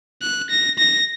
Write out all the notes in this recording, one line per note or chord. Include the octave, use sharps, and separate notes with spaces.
F#6
A#6
A#6